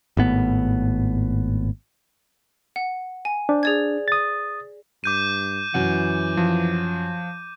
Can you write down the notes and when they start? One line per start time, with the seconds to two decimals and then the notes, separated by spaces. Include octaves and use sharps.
0.17 G#1 A2 B3
2.76 F#5
3.25 G#5
3.49 D4 C5
3.63 G#4 D5 G#6
4.08 D#6 A6
5.04 G2 D6 G6 D#7
5.74 F#2 E3 F#5
6.37 F3